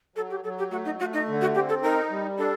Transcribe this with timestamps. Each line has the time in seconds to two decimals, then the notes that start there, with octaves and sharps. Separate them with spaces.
0.16 F#3 A4
0.30 G4
0.44 F#3 A4
0.58 G4
0.71 A3 F#4
0.85 D#4
1.00 A3 F#4
1.13 D#4
1.28 D3
1.41 F#4
1.55 C4 G4
1.69 A4
1.83 D#4 A#4
2.11 G3
2.38 D4 A4